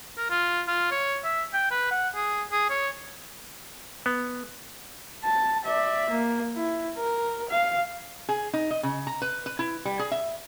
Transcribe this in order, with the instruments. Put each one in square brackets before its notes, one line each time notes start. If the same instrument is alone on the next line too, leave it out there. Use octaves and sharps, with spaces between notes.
[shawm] A#4
F4
F4
C#5
E5
G5
B4
F#5
G#4
G#4
C#5
[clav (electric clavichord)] B3
[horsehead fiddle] A5
D5 E5
A#3
E4
A#4
F5
[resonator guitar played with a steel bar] G#4
D#4
D#5
C#3
A#5
B4
B4
E4
G3
G#4
E5